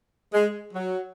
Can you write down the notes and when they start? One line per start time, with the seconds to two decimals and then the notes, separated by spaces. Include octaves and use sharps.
0.33 G#3
0.73 F#3